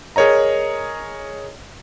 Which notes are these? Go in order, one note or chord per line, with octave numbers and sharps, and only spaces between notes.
G#4 A#4 C#5 D#5 A#5